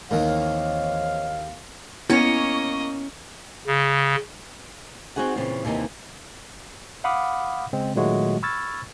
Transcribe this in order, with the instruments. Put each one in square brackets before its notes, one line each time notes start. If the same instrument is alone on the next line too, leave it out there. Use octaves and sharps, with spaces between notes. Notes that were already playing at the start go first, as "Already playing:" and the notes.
[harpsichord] D#2 D#3 [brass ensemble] E3 C4 C#5 [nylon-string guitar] A#3 [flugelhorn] F5
[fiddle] A#3 D#5 [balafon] B3 [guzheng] C#4 C#5 [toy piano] E4
[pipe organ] C#3
[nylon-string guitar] C4 D#4 F#4 G#4 F#5
A#2 C#3 E3 C4 F4
D#2 C3 E3 A3 A#3 D#4
[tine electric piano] F5 F#5 B5 D6 D#6 F6
C#3 G#3 C4
A#2 D#3 F#3 G#3 A3 F#4
B5 C#6 E6 F6 G#6 A6